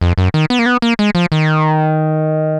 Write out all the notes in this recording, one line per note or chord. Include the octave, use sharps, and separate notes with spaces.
F2
F#2
D#3
B3
A#3
B3
A#3
G#3
F3
D#3